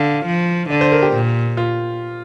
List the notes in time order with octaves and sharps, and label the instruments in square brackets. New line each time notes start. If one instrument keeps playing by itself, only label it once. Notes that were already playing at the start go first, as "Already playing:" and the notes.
Already playing: [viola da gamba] D3 [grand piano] F5
[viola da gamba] F3
[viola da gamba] D3 [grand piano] D5
[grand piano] C5
A#4
G4
[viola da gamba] A#2
[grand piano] F4